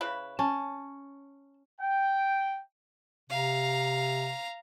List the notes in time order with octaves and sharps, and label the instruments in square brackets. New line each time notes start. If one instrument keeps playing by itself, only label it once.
[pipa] C#3 E4 B4
[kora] C#4 [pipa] A5
[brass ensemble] G5
[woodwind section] C3 [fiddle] F5 A#5